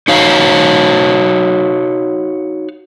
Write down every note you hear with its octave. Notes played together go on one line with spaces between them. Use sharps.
D#4 F#4 C#5 F5